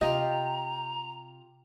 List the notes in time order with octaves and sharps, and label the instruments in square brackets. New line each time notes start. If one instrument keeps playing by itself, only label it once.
[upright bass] C3 [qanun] F4 G4 [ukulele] D#5 [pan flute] A#5